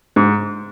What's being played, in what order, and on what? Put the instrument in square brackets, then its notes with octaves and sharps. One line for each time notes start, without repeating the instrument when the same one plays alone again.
[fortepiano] G#2